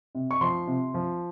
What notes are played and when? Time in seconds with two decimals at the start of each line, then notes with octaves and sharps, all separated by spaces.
0.15 C3
0.31 C#6
0.41 F3 C6
0.67 C3
0.94 F3